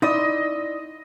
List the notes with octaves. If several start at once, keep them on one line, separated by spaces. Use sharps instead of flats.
D#4 E4 D5 D#5 D#6 E6